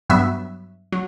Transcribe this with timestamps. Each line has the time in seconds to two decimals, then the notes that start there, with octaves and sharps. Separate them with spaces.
0.10 G2 F#3 B3 E5
0.92 F#3